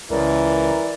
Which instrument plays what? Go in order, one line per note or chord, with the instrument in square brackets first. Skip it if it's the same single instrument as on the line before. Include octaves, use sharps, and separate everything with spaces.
[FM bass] C#2 [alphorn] E3 [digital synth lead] A#4 [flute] D5